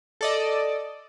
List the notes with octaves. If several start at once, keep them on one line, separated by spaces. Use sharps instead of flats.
A4 D5 D#5